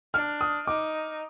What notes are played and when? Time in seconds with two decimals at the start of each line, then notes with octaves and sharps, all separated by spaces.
0.14 D4 F6
0.41 D#6
0.67 D#4 D6